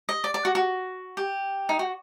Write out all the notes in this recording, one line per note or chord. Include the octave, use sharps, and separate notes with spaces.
D#5
D5
D5
F#4
F#4
G4
D#4
F#4